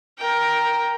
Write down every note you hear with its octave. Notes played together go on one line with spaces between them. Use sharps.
A#4 G5